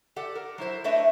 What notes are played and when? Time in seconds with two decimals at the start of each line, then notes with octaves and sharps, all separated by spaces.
0.16 G4 A4 D5 F#5
0.35 A#4
0.58 F#3 E4 C5
0.84 A3 D4 B4 C#5 D#5 E5